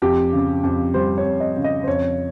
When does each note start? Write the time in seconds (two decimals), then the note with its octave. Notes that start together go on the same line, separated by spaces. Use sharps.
0.02 F2 G4
0.33 C#3
0.63 F2
0.94 G3 C5
1.18 C#5
1.25 F2
1.40 D#5
1.57 C#3
1.64 D#5
1.83 C5
1.87 F2 C#5